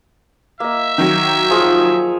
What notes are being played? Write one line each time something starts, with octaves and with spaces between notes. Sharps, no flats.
A#3 D#5 E5
D#3 F#3
F3 G#4 C#6